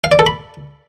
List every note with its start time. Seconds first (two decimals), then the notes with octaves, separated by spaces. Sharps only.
0.04 F5
0.12 D5
0.19 A4
0.27 B5